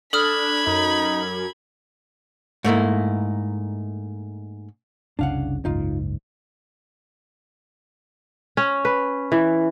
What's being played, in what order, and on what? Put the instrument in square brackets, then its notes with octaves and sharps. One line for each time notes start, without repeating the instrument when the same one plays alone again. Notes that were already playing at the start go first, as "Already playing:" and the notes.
[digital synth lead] D4 [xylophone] A4 D#6 F6 [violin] B5 G#6
[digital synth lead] F#2 [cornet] D#4
[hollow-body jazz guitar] G#2 A3 A#3 E4
[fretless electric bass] F#1 C2 C#3 [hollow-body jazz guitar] D4 F5 F#5
[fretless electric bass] F#1 C#2 G#2 [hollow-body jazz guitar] D#4 F4
[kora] C#4
B4
E3